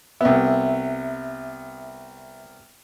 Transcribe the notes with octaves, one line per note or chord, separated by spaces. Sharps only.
C2 B3 E5